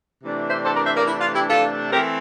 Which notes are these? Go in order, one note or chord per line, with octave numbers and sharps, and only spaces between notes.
C3 E3 A3 D4
C5 E5
A4 C5
A#4 D5
C5 E5
A#4 D5
E4
F4
E4 G4
F4 A4
E3 A3 C4 G4 A#4